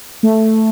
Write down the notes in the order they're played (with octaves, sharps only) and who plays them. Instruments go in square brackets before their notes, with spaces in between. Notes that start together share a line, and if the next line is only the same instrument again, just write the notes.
[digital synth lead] A3